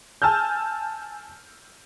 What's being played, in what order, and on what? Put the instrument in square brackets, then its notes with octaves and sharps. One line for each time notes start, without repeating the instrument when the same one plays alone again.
[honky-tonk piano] G#5 A5 E6 F6 G6